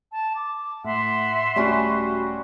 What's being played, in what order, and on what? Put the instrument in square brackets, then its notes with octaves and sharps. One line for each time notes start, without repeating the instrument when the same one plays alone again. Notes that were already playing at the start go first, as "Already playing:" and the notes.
[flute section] A5
D6
[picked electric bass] A2 [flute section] E5 F#5 C6
[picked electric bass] D#1 A3 [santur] G3 C#4 F#4